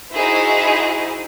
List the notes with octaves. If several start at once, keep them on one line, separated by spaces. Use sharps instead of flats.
D#4 E4 F#4 G#4 C5